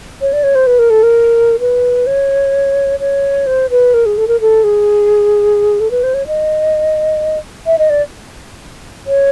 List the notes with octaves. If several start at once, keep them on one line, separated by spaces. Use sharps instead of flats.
C#5
D5
C#5
C5
B4
A#4
A4
A#4
B4
C#5
C#5
C5
B4
A#4
G#4
A4
A#4
A4
G#4
A4
B4
C5
C#5
D#5
E5
D#5
D5
C#5